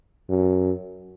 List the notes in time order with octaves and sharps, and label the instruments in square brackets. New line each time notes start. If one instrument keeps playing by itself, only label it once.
[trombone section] F#2